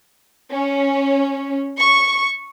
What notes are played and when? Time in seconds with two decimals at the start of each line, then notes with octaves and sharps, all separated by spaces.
0.51 C#4
1.79 C#6